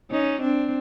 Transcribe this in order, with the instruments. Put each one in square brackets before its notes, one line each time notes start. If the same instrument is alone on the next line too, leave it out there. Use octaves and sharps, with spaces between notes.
[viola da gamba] C#4 D#4
C4 D4